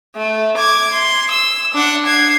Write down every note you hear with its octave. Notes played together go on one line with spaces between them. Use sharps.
A3
D6 G#6
C6
E6
D4 F#5
G#6 C7